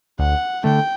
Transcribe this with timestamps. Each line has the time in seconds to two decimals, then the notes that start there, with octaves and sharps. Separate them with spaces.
0.19 D2 F#5
0.64 D3 A3 G5